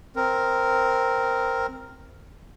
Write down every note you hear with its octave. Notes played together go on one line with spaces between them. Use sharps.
C4 A#4